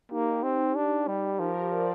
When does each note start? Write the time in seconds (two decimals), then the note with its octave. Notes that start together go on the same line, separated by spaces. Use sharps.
0.11 A#3 D#4 G4
0.43 C4
0.75 D4
1.07 G3
1.39 F3 G4 A#4
1.71 D5
1.79 C5